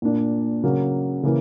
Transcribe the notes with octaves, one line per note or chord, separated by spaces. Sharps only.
A#2 A#3 D4
C#3 F#3 A#3
C#3 E3 A#3